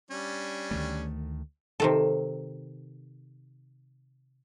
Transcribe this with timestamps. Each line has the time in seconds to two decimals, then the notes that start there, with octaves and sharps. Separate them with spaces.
0.11 G3 C#4 D4
0.71 D2 D#3 A3
1.80 C3 D#3 A4